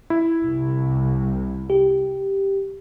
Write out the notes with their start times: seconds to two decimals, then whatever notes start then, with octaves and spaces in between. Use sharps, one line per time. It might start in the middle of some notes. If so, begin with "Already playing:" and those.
0.10 E4
0.43 C2
1.70 G4